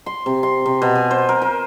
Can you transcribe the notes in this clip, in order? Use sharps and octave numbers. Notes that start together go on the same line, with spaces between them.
C6
C3
C6
C3
B2
G#5
C5
A#4
A#4